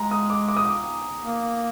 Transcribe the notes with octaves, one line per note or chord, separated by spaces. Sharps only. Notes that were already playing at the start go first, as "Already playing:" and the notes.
Already playing: G#3 A#5
D#6
D6
D6
D#6
D6
A#3